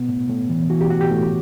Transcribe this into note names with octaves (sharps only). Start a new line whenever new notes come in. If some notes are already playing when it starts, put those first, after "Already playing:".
Already playing: B2 B3
A2
A2
E3
E3 F#4
G4
A2 F#4
G4
A2